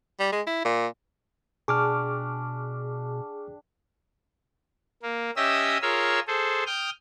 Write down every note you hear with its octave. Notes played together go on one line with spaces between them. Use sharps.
G3
G#3
E4
A#2
B2 D4 G4 G#4 C#6 D6 F6
A#3
C#4 G4 D#5 E5 D#6 E6
F4 G#4 A#4 C#5 E6
G#4 A4 C5
G5 D#6 F6 G6